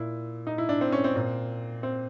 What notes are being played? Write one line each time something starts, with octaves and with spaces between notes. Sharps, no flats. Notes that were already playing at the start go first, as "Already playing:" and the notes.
Already playing: A#2 E4
D#4
E4
D4
C4
C#4
C4
A#2
C4